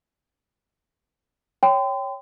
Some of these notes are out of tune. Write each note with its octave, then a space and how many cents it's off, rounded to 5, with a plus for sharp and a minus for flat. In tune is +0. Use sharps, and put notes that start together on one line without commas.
C#5 +0 G5 +0 C6 -40